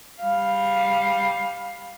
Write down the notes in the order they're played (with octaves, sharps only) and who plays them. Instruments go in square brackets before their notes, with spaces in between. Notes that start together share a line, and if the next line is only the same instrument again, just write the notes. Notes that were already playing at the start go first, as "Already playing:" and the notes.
[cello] G3 F5